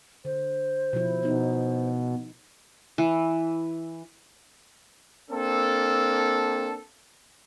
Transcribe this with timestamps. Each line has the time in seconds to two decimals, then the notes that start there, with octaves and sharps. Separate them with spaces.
0.25 D3 C5
0.93 B2 F3 E4
1.25 B2 D#4
2.98 E3
5.30 A#3 C4 D4 A4